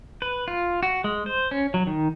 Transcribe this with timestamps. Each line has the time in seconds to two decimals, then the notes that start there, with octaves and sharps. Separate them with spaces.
0.22 B4
0.48 F4
0.83 F#4
1.04 G#3
1.26 C5
1.51 C#4
1.74 F#3
1.87 D#3